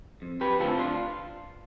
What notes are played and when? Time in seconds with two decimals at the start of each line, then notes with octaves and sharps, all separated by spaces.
0.22 F2
0.41 G4 B4
0.59 D3 A3 C4 F4 A4
0.79 D4 F4